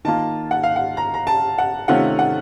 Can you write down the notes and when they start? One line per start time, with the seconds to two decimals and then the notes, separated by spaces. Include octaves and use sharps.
0.05 D#3 A#3 F4 A5
0.51 F#5
0.63 F5
0.76 F#5
0.97 A#5
1.14 A#5
1.27 A5
1.58 F#5
1.88 C3 D#3 A3 C#4 F4 F#5
2.19 F#5